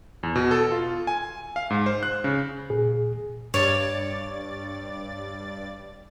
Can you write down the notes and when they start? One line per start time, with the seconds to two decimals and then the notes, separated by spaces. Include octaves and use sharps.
0.23 E2
0.36 B2
0.51 A4
0.72 F4
1.07 G#5
1.56 F5
1.70 G#2
1.86 C5
2.03 F#6
2.24 C#3
2.70 A#2 G#4
3.54 G2 C#5 D5 A6